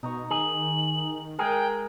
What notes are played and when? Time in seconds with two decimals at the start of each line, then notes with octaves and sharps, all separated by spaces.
0.03 B2 D#4 A#5 C#6
0.31 D#3 G#4 F#7
1.39 G#3 G#4 A#4 G5